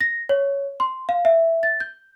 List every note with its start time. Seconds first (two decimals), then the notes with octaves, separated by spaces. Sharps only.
0.01 A#6
0.29 C#5
0.80 C6
1.09 F5
1.25 E5
1.63 A6
1.80 G6